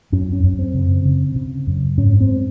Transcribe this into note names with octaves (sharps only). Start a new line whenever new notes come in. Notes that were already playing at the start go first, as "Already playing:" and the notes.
F#2 C#4
C#4
F#2
C4
C#3
C#3
C#3
F#2
G#2 C#4
C4